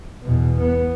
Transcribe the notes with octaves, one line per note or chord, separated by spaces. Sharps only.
E2 B2
B3